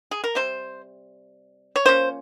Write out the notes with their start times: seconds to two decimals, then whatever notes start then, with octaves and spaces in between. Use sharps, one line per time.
0.11 G#4
0.24 A#4
0.35 C3 G3 C5
1.76 C#5
1.86 F3 A#3 C#4 C5